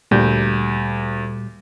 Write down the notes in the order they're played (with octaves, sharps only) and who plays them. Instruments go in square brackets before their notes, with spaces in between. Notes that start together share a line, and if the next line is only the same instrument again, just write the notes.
[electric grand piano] D2 [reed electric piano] A#2 G3 G6